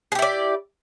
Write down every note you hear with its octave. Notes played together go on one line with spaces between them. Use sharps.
E4 G4 G#4 D5